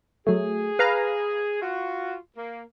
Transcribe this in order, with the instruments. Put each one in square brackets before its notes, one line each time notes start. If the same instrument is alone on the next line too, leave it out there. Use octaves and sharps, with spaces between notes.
[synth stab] F#3 A3 [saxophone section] G#4
[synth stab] B4 F5 A#5
[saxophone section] F4 F#4
A#3